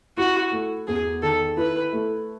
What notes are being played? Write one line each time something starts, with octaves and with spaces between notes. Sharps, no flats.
E4 F#4
A3
E2 G#4
D#3 A4
E4 B4
A3